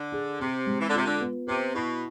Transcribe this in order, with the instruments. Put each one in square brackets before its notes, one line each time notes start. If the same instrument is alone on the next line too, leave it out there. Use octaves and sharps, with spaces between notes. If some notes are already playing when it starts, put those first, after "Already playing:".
Already playing: [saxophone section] D3
[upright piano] G#4
[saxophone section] C3 [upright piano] C4
[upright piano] G#3
[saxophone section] E3
D3
[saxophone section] C3 [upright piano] F4
[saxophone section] D3
[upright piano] B3
[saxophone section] C3 [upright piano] B4
[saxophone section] B2 [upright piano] E4